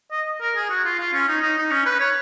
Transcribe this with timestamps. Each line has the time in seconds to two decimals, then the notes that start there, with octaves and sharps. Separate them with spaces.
0.11 D#5
0.41 A#4
0.56 G#4
0.70 F#4
0.85 F4
0.99 F4
1.13 C#4
1.28 D#4
1.42 D#4
1.58 D#4
1.71 C#4
1.86 B4
2.00 C#5